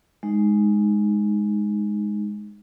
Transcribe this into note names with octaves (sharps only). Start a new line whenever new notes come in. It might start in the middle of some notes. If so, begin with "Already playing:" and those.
G#3 D#4